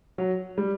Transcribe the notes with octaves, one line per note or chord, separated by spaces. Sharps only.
F#3
G3